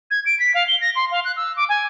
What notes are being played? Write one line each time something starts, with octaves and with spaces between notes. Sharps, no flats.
G#6
D7
B6
F5
G7
A#6
C6
F5
F#6
E6
D6
G#5